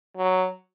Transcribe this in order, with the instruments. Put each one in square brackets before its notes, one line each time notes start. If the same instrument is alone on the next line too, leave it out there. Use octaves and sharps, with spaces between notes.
[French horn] F#3